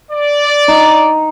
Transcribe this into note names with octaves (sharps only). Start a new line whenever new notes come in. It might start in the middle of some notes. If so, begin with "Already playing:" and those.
D5
D#4